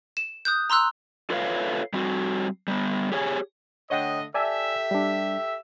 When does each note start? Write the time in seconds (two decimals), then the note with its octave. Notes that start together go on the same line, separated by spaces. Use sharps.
0.17 E7
0.45 D#6 F#6 G6
0.70 A#5 C6 E6 F#6
1.30 F4 A4 B4 C#5 E5 F5
1.93 G3 C4 F#4
2.68 G3 A#3 B3
3.12 G4 G#4 C#5 F5 G#5
3.90 D3 A3 C#5 D#5 F#5 G5
4.34 G4 A4 D5 E5 G#5 A5
4.91 G3 D4